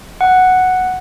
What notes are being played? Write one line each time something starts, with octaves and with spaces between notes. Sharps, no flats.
F#5